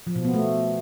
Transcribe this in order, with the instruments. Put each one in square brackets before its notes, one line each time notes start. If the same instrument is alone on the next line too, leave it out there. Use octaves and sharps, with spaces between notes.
[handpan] F3
B2
B3
A3